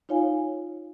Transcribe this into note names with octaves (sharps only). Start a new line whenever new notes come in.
D#4 F4 C#5 F5 G#5